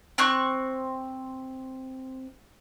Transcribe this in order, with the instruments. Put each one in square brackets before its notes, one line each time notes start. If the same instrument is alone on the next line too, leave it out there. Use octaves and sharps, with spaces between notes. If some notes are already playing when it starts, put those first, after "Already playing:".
[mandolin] C4 C#6 F#6